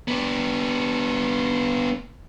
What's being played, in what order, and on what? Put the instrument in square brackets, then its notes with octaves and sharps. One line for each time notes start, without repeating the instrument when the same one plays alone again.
[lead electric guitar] B3 D4